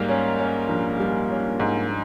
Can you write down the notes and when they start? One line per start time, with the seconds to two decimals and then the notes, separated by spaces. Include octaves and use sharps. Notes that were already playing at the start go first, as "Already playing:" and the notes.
Already playing: G#2 G3 A#3
0.09 C#4
0.39 C#4
0.69 A#1
1.00 G3
1.30 C#4
1.60 G#2